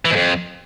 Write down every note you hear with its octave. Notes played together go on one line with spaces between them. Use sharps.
E3
G#2
F2